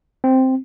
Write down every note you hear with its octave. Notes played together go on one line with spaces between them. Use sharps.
C4